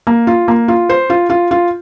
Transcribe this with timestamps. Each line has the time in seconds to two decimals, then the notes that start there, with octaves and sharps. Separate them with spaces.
0.07 A#3
0.27 F4
0.48 A#3
0.68 F4
0.89 C5
1.10 F4
1.30 F4
1.51 F4